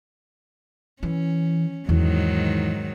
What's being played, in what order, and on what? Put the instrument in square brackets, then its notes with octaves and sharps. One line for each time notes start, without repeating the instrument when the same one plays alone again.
[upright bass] E3 [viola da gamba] C#4
[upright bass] E2 [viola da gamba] G#2 D#3 F#3